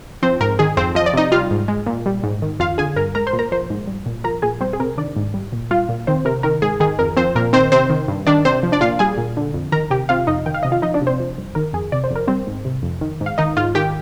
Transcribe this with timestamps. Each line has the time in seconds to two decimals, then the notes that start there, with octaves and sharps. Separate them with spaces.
0.22 F3 C4 C5
0.40 G#2 A#4
0.59 D#3 G#4
0.77 F2 C4 C5
0.95 F3 D#5
1.06 D5
1.13 C3 D#4 D#5
1.32 G3 F4 F5
1.51 G#2
1.68 G#3
1.86 A#2
2.06 G3
2.23 G#2
2.42 D#3
2.60 F2 F4 F5
2.78 D3 G#4 G#5
2.96 G2 A#4 A#5
3.15 G#3 A#4 A#5
3.27 C5 C6
3.33 A#2
3.39 A#4 A#5
3.52 F3 C5 C6
3.70 G#2
3.87 G3
4.06 A#2
4.24 F3 A#4 A#5
4.42 A#2 G#4 G#5
4.61 G3 C4 C5
4.73 G#4
4.80 C3 A#4
4.98 D#3 D4 D5
5.16 G#2
5.34 G3
5.52 A#2
5.71 G3 F4 F5
5.89 A#2
6.07 D#3 C4 C5
6.25 C3 A#4
6.43 D#3 A#4
6.62 G#2 G#4
6.80 D#3 G#4
6.99 F2 A#4
7.17 F3 C4 C5
7.35 A#2 A#4
7.53 D#3 C4 C5
7.72 C3 C4 C5
7.90 D#3
8.08 G2
8.27 D#3 D4 D5
8.45 C3 C4 C5
8.63 F3
8.72 D4 D5
8.81 A#2 F4 F5
8.99 G3 G#4 G#5
9.18 A#2
9.37 D3
9.54 F2
9.72 D#3 A#4 A#5
9.91 C3 G4 G5
10.09 C3 F4 F5
10.27 F2 D#4 D#5
10.46 D#3 G5
10.54 F5
10.63 C3 D#5
10.72 F4 F5
10.82 F3 D#4 D#5
10.94 D4 D5
11.01 C3
11.07 C4 C5
11.20 F3
11.38 G2
11.55 D#3 A#4
11.73 F2 G#4
11.92 C3 D5
12.04 C5
12.10 F2
12.15 A#4
12.28 G3 C4 C5
12.47 G#2
12.65 C3
12.83 F2
13.01 D#3
13.21 G#2
13.26 F5
13.38 D#3 D#4 D#5
13.57 G#2 F4 F5
13.75 D#3 G4 G5